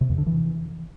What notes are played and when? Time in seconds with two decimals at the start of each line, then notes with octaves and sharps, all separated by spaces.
0.01 C3
0.10 E2
0.18 D3
0.27 E3